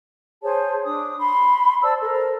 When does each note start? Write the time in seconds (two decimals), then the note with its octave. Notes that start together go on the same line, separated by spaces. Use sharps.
0.43 G#4 C5 C#5 A5
0.85 D4 D#6
1.19 B5 C6
1.82 C5 D5 A5 E6
2.02 A4 A#4 C5